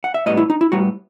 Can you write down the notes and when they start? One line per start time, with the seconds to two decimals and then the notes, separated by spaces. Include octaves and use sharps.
0.04 F#5
0.14 E5
0.26 A2 G3 B3 D#5
0.37 E4
0.50 D#4
0.61 E4
0.72 A2 G3 B3 F#4